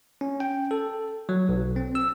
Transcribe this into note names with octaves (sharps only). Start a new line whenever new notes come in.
C#4
G5
A4
F#3
B1
C4
E6